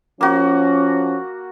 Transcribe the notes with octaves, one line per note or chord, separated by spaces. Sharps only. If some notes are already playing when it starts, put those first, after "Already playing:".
F3 A#3 C#4 F#4